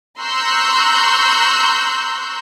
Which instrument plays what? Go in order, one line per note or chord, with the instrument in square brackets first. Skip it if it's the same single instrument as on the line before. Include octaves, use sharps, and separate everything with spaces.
[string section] A#5 C6 C#6 E6 F#6 G6